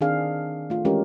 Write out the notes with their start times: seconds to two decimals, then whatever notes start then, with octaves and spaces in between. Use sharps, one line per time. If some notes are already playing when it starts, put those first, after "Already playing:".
0.01 D#3 C4 D4 G#4 F5
0.70 A3 F4
0.85 E3 G#3 C#4 G4 A#4